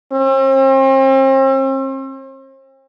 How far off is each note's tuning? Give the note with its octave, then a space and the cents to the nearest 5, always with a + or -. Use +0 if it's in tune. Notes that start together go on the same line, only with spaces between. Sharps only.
C4 +40